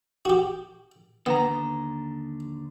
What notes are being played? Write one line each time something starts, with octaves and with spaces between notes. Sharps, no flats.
F#4 G4
D#2 D3 B3 A#5